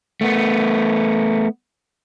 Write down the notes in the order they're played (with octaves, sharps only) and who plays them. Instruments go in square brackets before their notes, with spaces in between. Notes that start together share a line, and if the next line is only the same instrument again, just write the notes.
[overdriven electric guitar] A3 B3